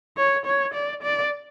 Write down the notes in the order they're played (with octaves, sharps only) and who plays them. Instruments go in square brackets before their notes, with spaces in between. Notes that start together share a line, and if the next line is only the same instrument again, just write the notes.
[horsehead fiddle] C#5
C#5
D5
D5